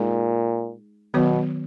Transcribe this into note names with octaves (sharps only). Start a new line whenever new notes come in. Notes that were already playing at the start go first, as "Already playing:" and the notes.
Already playing: A#2 G#3 D#4 G#4
B2 D#3 F#3 B3 F#4 C#5